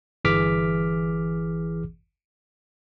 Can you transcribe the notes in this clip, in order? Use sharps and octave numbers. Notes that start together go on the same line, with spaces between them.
G1 E3 G#4 D6 F6 B6